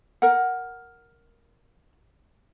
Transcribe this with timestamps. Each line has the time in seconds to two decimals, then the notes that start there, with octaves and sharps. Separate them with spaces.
0.22 A#4 F#5